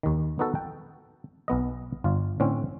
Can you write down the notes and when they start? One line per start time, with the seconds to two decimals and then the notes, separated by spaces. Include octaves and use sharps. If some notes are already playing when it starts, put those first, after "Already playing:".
0.03 D#2 D#3
0.39 B3 D#4 F#4 A4
0.55 G5
1.48 B1 B3 D#5
2.04 G1 F4
2.40 A2 D3 C4 C#4